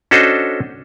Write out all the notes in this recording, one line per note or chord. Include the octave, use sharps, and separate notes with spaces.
C#4 D4 F#4 A4 C5 D#5